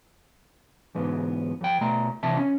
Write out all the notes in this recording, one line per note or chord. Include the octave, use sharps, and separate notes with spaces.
E2 G#2 B3
F2 G5
B2 A3 A#5
D#2 C3 E3 C4 E5 A5
C#4